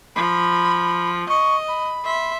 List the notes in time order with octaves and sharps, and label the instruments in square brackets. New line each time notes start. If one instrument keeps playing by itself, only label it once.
[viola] F3 [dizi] B5
[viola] D#5 [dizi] C#6
[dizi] B5
[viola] E5 C6